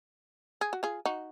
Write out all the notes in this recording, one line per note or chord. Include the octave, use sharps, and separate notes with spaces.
G#4
F#4
F4 G#4
D#4 F#4